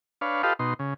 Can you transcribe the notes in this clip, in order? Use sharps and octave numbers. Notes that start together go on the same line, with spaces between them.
D4 B4 C#5 F5
F4 G4 A4 B4 D#5 F5
B2 D#4 C6
C#3